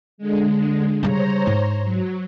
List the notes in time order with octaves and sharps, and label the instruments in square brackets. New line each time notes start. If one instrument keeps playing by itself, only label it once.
[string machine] D3 G#3
[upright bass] C#3 G3 [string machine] C5 C#5 A#5
[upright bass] G#2
[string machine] F#3